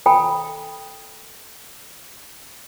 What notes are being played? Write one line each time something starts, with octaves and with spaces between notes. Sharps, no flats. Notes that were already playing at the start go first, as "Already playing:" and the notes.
A4 G5 B5